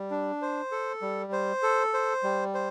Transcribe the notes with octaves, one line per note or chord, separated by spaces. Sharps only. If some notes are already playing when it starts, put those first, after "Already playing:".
Already playing: G3
D4
C5
A4
G3
C5
A4
C5
G3
C5